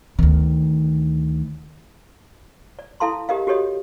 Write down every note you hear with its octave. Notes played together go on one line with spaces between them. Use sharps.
D2 D#3
D5
E4 A4 F5 A5 C6
G4 A#4 D#5 F5
F#4 G4 A4 C#5 D#5